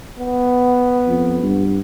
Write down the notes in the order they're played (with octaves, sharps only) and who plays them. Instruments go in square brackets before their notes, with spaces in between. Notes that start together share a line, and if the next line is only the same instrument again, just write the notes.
[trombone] B3
[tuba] F2
G2